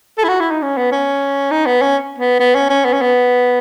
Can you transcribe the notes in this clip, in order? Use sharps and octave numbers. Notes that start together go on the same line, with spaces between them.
A4
E4
F#4
E4
D#4
C#4
B3
C#4
D#4
B3
C#4
B3
B3
C#4
C#4
B3
C#4
B3